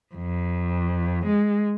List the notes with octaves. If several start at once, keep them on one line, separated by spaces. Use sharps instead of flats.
F2
G#3